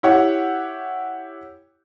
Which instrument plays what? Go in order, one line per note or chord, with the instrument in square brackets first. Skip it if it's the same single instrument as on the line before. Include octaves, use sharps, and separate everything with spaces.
[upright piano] E4 G4 C#5 F#5